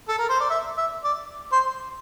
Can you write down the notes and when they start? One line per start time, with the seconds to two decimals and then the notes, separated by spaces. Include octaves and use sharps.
0.08 A4
0.19 A#4
0.29 C5
0.40 D5
0.50 E5
0.77 E5
1.04 D5
1.52 C5